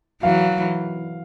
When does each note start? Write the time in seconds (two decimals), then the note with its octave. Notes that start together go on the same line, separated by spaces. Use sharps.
0.22 E3 F#3 F5